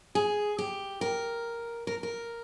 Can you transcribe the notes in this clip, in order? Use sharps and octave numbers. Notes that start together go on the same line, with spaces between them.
G#4
G4
A#4
A#4
A#4